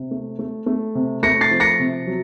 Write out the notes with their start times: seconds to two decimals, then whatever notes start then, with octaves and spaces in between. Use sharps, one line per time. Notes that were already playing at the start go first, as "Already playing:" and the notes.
Already playing: C3
0.11 A3
0.39 A3
0.66 A3
0.95 C3
1.23 A3 A#6 C#7
1.41 A6 C7
1.51 F3
1.60 A#6 C#7
1.79 C3
2.07 F#3